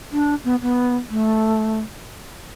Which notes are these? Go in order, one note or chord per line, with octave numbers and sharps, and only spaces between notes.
D4
B3
B3
A3